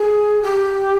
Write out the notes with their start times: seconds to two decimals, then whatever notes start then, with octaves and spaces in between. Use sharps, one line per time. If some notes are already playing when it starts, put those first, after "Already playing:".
Already playing: G#4
0.43 G4